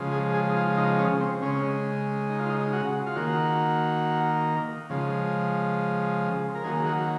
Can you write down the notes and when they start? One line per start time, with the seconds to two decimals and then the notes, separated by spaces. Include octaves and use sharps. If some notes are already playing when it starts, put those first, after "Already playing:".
Already playing: C#3 F3 G#3
0.12 G#4
0.34 G#4
0.50 D#4
0.56 F4
0.77 D#4
0.99 C#4
1.21 C4
1.42 C#3 G#3 C#4
2.30 D#4
2.40 F4
2.50 D#4
2.73 F#4
3.06 F4
3.16 D#3 A#3 F#4
4.90 C#3 F3 G#3
6.55 A#4
6.64 D#3 F#3 A#3 G#4
6.86 F#4